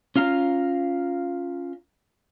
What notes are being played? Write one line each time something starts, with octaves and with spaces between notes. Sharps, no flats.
C#4 F4 F5 A#5